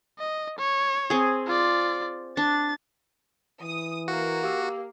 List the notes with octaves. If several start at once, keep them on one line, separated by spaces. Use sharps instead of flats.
D#5
C#5
C4 G#4
F4 D5
D4 A6
E3 D#6
A#3 F#4 F5 F#5
G4 F5 E6